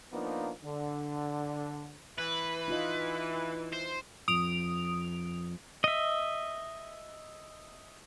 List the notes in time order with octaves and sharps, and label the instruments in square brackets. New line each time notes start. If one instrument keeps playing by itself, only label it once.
[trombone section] F3 A#3 B3 D4 D#4
D3
[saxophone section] E3 [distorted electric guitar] B4
[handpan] D#4 F4 D#5
[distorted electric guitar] C5
[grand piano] F2 [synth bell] D#6 D7 F7
[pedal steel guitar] D#5 E5